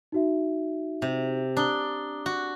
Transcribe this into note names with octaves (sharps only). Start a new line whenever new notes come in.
D#4 F#4 E5
C3
D4 A#5 D#6 G7
F#4